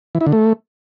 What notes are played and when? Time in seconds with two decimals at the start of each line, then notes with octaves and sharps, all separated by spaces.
0.15 E3
0.21 E4
0.27 D3
0.32 A3